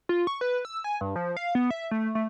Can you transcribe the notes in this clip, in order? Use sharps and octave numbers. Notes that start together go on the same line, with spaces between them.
F4
C#6
B4
E6
G#5
G2
F3
F5
B3
E5
A3
A3